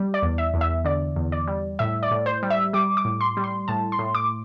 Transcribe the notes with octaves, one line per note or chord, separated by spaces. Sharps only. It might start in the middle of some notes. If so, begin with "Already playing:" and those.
Already playing: G3
D5
E2
E5
E2
E5
D3 D5
E2
D5
G3
A2 E5
D5
A2
C5
G3
E5
G3 D6
D6
A2
C6
G3
C6
A2 A5
C6
A2
D6